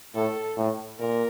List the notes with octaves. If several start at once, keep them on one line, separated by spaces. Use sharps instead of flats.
A2 A4
A2
A#2 A#4